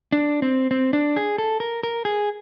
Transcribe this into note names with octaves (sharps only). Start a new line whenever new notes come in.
D4
C4
C4
D4
G#4
A4
A#4
A#4
G#4